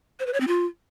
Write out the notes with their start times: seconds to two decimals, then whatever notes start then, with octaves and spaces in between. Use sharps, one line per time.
0.20 C5
0.26 B4
0.33 C#5
0.40 C4
0.47 F4